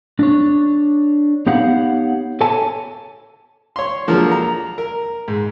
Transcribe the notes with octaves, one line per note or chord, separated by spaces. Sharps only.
D4 C#5
B3 D#4 G4 C#5 F5 F#5
A4 C#5 G#5 A5
C#5 C6
D3 F3 F#3 G#3 A#3
A#5
A#4
G#2